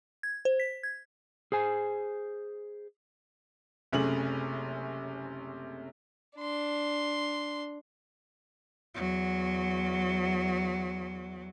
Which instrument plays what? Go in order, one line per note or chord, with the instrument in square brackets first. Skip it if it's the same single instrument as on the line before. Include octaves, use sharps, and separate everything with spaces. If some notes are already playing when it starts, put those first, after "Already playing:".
[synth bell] G#6
C5
B6
G#6
[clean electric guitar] G#4 C5 G#5
[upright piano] F#1 C3 A3 C#4 G#4 F#7
[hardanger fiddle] D4 C6
[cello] E2 F#3